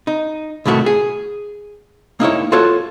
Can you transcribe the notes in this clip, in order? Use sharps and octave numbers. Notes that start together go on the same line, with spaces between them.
D#4
C2 A2 D#3 A3 F#4
G#4
A#3 D#4 E4 C#5
F4 F#4 A4 C#5